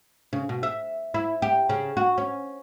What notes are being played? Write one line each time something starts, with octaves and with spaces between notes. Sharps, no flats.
C#3
B2
E5
E4
G4
C#3
F#4
C#4